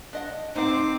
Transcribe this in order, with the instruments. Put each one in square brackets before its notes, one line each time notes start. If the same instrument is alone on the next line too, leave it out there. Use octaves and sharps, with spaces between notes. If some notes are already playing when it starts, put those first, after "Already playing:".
[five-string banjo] D4 D#5 F#5
[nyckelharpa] C4 [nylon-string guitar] D#4 [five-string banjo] C5 F#5 [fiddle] D6